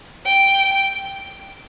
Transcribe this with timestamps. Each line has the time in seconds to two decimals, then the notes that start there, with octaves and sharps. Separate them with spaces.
0.26 G5